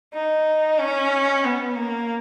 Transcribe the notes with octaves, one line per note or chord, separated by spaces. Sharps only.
D#4
C#4
B3
A#3